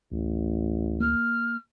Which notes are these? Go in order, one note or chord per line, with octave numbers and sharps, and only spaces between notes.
A1 D2
A#3 F6